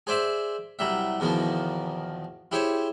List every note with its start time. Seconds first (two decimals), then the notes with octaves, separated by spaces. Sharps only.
0.07 G#4 C5 D5 E5 C6
0.79 C2 F#3 G3 E5
1.20 E2 B2 D#3 F3 A#3
2.52 E4 G4 G#4 C5 C#5